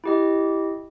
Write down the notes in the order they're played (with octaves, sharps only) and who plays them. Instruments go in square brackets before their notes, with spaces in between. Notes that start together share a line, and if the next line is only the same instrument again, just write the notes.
[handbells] E4 G4 D#5